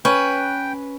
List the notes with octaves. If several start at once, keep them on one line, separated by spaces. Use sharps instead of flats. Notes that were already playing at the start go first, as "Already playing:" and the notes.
C#4 B4 G5